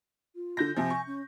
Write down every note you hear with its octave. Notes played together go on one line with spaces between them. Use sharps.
F4
D3 G6 A#6
C3 F3 G#5
C#6
C#4